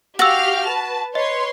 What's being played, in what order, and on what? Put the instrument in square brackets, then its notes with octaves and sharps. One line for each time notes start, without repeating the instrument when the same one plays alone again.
[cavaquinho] F#4 [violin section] G4 F5 F6 [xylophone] E6 A6
[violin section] B4 A5
[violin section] B4 C#5 C6 [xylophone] D#5